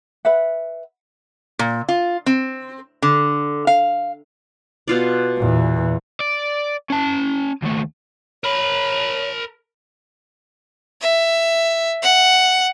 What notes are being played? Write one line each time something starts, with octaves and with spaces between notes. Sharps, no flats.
B4 E5 F#5
A#2
F4
C4
D3
F5
B2 F4 D5
E2 A#2
D5
C#4 A5
D#2 A3
A#4 C#5 B5
E5
F#5